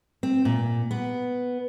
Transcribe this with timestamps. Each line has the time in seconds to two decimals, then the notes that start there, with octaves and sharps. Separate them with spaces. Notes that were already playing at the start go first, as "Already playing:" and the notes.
0.23 C4
0.45 A#2
0.91 B3